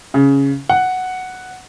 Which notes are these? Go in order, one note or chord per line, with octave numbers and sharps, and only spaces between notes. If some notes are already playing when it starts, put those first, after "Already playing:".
C#3
F#5